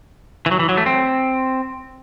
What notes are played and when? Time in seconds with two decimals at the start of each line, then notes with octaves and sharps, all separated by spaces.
0.46 E3
0.51 F#3
0.59 E3
0.69 F#3
0.77 A3
0.86 C4